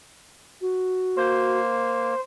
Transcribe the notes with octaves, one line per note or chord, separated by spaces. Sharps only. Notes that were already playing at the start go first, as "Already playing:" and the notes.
F#4
A#3 C5